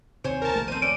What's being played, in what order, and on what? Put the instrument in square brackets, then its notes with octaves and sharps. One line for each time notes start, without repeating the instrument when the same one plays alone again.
[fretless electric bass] D#2 C3 [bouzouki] C5 C#5 G#5
[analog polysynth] A#4 A5
[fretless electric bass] D#1 A#1 A3
[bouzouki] C4 C5 [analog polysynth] D#7
[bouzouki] C#4 D4 [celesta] D7